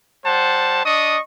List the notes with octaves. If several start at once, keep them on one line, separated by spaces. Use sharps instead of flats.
G3 C5 F#5 A5
D4 D#5 C#6 D#6